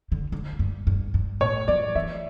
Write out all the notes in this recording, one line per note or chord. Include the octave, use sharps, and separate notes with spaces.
D3
D3
G2
G2
G2
A2 C#5
F3 D5
E3 E5